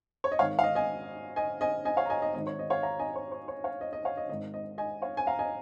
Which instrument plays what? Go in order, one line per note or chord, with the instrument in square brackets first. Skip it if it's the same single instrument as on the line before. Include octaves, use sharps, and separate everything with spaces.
[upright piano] C#5
D#5
G#1 G#2 D#3 C#5 F5
F5
D#5
D#5 G#5
D#5 G#5
D#5 G#5
D#5 G#5
C#5 F5
A#5
D#5 G#5
D#5
G#1 G#2 D#3 D#5
C#5
D#5
C#5 F5
F5 A#5
D#5 G#5
C#5
C#5
C#5
C#5 F5
D#5
D#5
C#5 F5
D#5
G#1 G#2 D#3 D#5
D#5
D#5 G#5
C#5 F5
G#5
F5 A#5
D#5 G#5